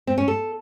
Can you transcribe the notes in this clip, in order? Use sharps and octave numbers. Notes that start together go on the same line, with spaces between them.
C4
C#4
A4